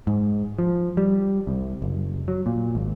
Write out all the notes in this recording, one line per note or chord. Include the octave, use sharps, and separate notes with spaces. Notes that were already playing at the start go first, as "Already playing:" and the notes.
G#2
F3
G3
C2
F#1
F#3
A#2
G#1